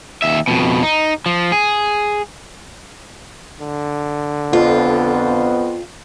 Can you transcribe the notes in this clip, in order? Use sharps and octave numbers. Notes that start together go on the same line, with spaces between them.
D#2 E5
F2 B2
D#4
F3
G#4
D3
F2 B3 F4